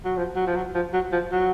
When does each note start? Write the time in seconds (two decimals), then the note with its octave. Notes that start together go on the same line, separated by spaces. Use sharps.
0.05 F#3
0.17 F3
0.36 F#3
0.47 F3
0.56 F#3
0.75 F3
0.93 F#3
1.12 F3
1.32 F#3